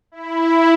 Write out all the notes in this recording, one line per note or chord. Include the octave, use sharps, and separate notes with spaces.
E4